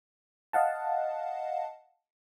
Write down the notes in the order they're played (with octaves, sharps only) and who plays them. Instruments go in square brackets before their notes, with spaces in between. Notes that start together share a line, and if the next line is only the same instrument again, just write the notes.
[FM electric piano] D#5 F5 F#5 A5